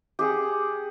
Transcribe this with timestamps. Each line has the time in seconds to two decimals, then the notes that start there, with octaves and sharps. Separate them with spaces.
0.19 G4 G#4 F#5